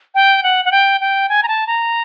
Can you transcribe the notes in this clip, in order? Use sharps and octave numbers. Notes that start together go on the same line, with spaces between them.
G5
F#5
F#5
G5
G5
G#5
A#5
A5
A#5